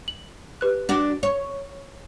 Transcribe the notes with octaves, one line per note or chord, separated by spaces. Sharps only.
F#7
G4 B4 F#6
D4 F#4
C#5